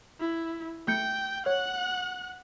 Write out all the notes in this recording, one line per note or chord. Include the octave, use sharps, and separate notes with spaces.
E4
A3 G5 G6 C#7
C#5 F#5 F#6